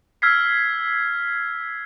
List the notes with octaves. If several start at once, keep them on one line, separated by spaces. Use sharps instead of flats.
E6 F6 G#6 B6 C7